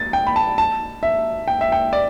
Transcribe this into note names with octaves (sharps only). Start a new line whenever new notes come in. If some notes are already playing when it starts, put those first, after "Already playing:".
Already playing: A6
G5
B5
A5
A5
E5
G5
E5
G5
D5